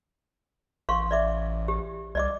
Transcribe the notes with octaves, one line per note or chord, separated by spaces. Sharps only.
A1 F5 C6 C#6
D5 E5 D6
G4
C2 D5 D#5 D6